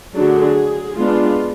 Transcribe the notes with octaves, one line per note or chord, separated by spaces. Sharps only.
D3 F#3 A3 D4 G#4
G#3 B3 D4 F4